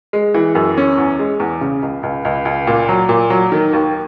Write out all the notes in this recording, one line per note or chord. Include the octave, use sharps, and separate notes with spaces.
G#3
E3
F#2
C#4
E2
G#3
E2
C#3
C#2
C#2
C#2
C#2
A#2
F#3
A#2
F#3
D#3
D#2